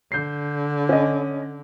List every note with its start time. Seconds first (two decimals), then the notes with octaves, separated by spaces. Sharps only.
0.12 D3 G6 C7
0.89 C#4 D#5